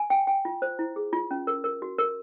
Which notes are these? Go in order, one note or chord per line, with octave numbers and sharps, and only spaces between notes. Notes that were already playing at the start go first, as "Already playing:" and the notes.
Already playing: G#5
G5
G5
F4
C5
E4
G#4
F4
C#4
A#4
A#4
F#4
A#4